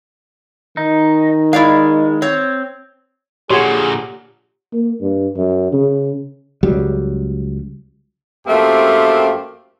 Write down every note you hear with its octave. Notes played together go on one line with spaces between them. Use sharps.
D#3 D#4
G#3 E4 D5 F5
C4 C#5
A#2 D3 G4 G#4 C#5 F#5 C6
A#3
G2
F#2
C#3
C#2 F#3 G3
F#2 F3 A3 A#3 C4 G4